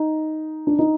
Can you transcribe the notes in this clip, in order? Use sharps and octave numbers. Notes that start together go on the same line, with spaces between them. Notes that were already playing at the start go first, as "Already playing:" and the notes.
Already playing: D#4
D4
D#4